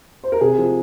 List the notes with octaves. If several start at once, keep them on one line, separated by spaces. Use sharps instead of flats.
C5
A#4
C3 G#4
F3